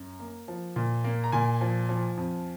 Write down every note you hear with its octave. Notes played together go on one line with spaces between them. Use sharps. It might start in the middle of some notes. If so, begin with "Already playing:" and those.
Already playing: F#2
A#3
F3
A#2
A#3
A#5
A#2 G#5
F3
F3
F2